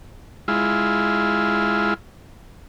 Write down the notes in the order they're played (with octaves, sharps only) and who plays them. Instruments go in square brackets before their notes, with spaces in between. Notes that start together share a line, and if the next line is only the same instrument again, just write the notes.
[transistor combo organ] G#3 E4 F4